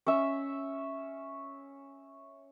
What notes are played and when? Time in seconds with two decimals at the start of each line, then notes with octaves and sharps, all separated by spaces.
0.06 C#4 E5